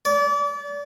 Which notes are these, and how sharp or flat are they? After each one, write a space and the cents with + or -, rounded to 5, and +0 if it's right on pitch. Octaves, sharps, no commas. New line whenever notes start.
D5 -35